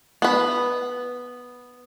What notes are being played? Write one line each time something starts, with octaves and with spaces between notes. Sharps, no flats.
B3 B4